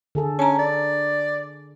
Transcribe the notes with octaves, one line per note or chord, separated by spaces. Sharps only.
D3 G#4 A4
C#4 A5 A#5
D5